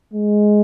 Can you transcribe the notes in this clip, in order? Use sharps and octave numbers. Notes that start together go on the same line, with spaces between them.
G#3